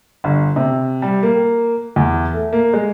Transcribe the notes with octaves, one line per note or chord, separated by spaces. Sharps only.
G1
C3
G3
A#3
E2
A3
A#3
G#3